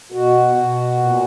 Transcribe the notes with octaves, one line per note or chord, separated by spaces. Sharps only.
B2 F#4
B2
A#2